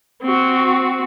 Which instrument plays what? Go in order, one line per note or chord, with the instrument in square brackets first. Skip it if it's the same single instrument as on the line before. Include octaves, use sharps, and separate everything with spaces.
[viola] C4 F#4